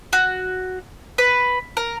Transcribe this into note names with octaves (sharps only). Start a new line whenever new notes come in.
F#4
B4
A#4